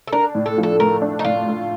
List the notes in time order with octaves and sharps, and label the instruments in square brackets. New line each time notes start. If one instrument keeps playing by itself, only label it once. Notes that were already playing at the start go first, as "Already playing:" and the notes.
[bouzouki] A4
[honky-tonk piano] D4 [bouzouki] A#4
[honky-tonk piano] A2
[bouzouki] A4
[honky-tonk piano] F3
[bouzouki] A4
[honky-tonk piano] A3 [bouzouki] A#4
[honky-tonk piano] D4
[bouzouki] D#4
[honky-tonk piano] A2 [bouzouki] F4
[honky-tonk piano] A3